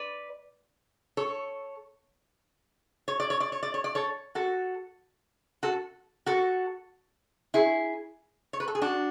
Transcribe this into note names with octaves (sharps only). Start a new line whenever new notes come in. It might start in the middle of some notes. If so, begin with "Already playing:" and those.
Already playing: B4 D5
A4 C#5
C#5
D5
C#5
D5
C#5
D5
C#5
D5
A4 C#5
F#4 A4
F#4 A4
F#4 A4
E4 G#4
C#5
B4
A4
G#4
D4 F#4